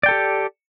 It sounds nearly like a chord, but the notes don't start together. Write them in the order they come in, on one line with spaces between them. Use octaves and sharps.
D5 G5 A4 G4